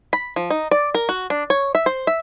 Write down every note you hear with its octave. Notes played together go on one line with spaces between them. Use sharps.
B5
F3
D#4
D5
A#4
F#4
D4
C#5
E5
C5
E5